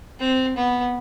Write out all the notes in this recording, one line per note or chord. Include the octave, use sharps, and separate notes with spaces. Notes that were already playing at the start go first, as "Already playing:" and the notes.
C4
B3